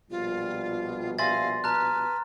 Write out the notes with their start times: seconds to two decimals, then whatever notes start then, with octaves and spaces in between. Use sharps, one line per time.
0.11 A#1 B2 G3 F4
1.19 E5 F5 G#5 C6 A6 A#6
1.64 B4 A5 A#5 F6 F#6